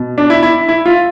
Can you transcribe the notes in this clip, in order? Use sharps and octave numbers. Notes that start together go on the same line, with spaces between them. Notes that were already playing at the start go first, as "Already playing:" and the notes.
Already playing: B2
D4
E4
E4
E4
F4